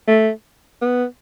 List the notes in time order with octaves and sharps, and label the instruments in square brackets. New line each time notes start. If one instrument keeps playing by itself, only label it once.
[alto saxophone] A3
B3